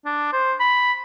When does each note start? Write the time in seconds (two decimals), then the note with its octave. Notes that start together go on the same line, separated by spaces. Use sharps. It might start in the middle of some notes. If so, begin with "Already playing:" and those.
0.05 D4
0.33 C5
0.60 B5